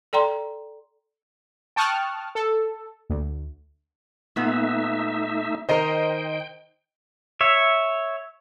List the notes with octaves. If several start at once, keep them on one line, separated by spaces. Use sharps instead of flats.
A4 D5 G5 A#5 C6
G5 A5 C#6 D#6 F6 F#6
A4
D2
A#2 A3 B3 D#4 E5
D#3 A#4 C5 D#5 G5 C7
C#5 E5